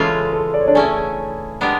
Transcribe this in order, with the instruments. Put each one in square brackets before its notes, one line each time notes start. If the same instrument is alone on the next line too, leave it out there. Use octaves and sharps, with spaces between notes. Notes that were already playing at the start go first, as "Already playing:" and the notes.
Already playing: [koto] C#3 E3 G#3 C#4 F4 [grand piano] A4
[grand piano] A4
D5
C#5
D4 D5
[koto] A3 C#4 E4 [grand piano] G#4 G#5
[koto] G#3 B3 D4 G4 A#4